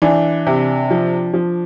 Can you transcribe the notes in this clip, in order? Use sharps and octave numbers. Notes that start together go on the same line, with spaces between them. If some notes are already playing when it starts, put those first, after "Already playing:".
E3 D4
C3
F3
F3